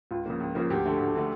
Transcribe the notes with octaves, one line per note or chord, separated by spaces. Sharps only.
C#2 F4
C#3 F3 A#3
C#2
C#3 F3 A#3
D2 G4
D3 A3
D2
D3 A3